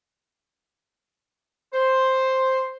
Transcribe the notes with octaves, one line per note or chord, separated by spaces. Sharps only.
C5